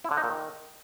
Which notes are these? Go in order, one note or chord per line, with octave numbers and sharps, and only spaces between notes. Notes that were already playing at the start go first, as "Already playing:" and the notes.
E4
D3
D#4
A#2
D#3